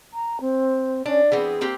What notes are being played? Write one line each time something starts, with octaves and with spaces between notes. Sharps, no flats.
A#5
C4
C#4 D4
E3 B3 C4 G#4
A#3 C4 G4